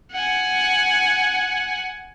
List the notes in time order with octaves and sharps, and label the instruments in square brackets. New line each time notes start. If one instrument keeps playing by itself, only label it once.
[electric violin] F#5 G#5